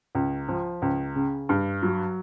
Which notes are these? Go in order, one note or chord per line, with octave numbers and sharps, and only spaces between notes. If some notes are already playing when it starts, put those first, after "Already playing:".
C#2
F3
C#2
C#3
G2
F#3